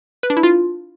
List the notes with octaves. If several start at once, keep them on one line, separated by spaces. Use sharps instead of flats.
B4
D4
E4
F4